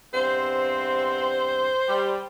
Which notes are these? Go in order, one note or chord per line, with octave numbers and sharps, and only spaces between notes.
E2 G2 C4 C5
G3